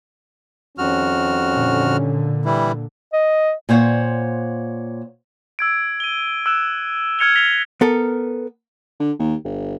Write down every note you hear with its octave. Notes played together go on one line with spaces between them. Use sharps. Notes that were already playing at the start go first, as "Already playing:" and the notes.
F2 D#3 G3 C#4 F#4 F6
A#2 D3
E3 G3 E4
D#5
A#2 C5 C#5 F#5
E6 G#6 D7
D#7 G7
E6 F#6 E7
E6 F6 G#6 C#7 F7 G7
A#6 B6 F7 G7
B3 A4 A#4
D3
D#2
G1